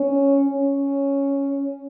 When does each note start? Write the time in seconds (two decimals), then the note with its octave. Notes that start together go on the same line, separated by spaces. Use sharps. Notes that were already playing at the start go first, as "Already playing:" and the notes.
Already playing: C#4
0.48 C#4